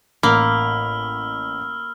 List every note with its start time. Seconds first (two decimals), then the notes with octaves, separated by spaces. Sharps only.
0.23 A1 A#3 B5 E6 F6